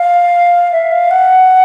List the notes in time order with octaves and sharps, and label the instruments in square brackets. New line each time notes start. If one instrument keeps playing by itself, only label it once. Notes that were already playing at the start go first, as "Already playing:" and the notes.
Already playing: [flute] F5
E5
F5
F#5